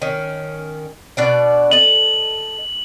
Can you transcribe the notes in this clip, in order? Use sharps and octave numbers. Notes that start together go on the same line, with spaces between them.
D#3 C#4
B2 D4 D5
A4 D#5 F#7